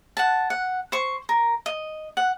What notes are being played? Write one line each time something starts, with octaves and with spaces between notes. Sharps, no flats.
F#5 A5
F#5
C5 C#6
A#4
D#5
F#5